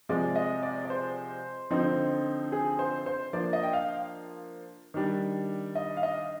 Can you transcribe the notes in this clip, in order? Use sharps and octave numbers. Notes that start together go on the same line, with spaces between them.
C3 F3 G#3 D5
D#5
D5
D5
C5
D3 F3 C4 D#4
G#4
C5
C5
F3 A#3 D4 D5
D#5
G5
F5
D#3 G3 D4
D#5
F5
D#5